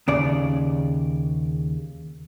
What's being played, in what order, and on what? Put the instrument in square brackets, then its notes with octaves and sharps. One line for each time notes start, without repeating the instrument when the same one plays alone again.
[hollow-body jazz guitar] D#2 C#3 D5